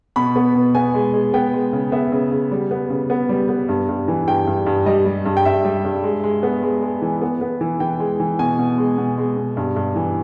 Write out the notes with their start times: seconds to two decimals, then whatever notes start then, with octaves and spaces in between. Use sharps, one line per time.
0.16 B2 B5
0.36 B3
0.55 B2
0.75 B3 G#5
0.94 G#3
1.14 G#3
1.34 B3 G5
1.53 G#3
1.73 C#3
1.92 B3 E5
2.12 C#3
2.32 C#3
2.51 G3
2.71 B3
2.90 C#3
3.10 B3
3.29 G3
3.49 B3
3.69 G2
3.89 G2
4.08 E3
4.27 G2 G5
4.47 G2
4.66 G2
4.86 G3 D#5
5.06 G3
5.26 G2
5.37 G5
5.45 G2 E5
5.65 G3
5.84 G2
6.04 G#3
6.23 G#3
6.43 B3
6.63 G#3
6.82 G#3
7.02 E3
7.22 B3
7.41 B3
7.61 E3
7.80 E3 G5
8.00 G#3
8.20 E3
8.39 B2 G#5
8.59 B2
8.78 G#3
8.98 B2
9.18 G#3
9.37 B2
9.57 G2
9.76 G2
9.96 E3